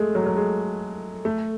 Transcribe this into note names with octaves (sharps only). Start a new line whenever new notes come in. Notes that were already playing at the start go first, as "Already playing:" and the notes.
Already playing: G#3 A3
F#3
F#3
G#3
A3